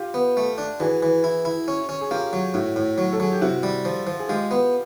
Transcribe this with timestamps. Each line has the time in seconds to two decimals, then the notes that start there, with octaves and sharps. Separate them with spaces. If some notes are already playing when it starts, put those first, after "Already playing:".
Already playing: F4 G4
0.14 B3
0.37 A3
0.58 D4
0.80 E3 F#4 G#4
1.03 E3
1.24 E4
1.45 E4
1.68 C#4
1.89 C#4
2.01 G#4
2.11 A#3 F4 G4
2.33 F#3
2.54 A2 E4 F#4
2.76 A2
2.98 F#3
3.12 A4
3.20 F#3 G#4
3.32 G4
3.42 C3 E4 F#4
3.63 G3
3.85 F3
4.07 F3
4.19 G#4
4.29 G#3 F4 G4
4.51 B3